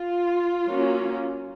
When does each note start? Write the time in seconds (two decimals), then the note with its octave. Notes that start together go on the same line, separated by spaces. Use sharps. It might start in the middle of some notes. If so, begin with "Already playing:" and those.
Already playing: F4
0.67 F#3 A#3 C#4